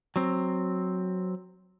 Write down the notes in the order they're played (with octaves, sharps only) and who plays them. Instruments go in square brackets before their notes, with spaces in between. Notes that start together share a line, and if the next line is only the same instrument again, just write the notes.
[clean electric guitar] F#3 C4